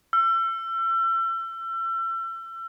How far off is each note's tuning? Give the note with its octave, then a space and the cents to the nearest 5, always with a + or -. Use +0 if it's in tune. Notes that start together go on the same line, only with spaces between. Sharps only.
E6 +35